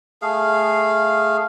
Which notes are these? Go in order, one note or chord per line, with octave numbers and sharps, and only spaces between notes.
A3 G#4 F5